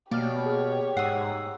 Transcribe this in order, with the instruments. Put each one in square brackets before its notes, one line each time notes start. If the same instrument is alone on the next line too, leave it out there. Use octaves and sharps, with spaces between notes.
[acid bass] B2 [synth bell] A#3 D6 F6 [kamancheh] G4 C#5 [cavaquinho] D5
[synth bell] G#4 F6
[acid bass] G#2 [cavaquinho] F#5 D#6 [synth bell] E6 C7